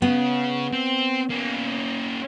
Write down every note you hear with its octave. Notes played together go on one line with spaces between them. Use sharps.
C#3 B3
C4
A#3 C#4